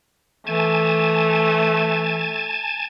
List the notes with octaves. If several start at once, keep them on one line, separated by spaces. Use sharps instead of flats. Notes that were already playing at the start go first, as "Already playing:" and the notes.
E3 A3 G#5 A5